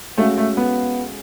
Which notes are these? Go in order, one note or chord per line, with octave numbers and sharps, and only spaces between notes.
G#3 A3 C#4 F#4 A4 F5
A3
B3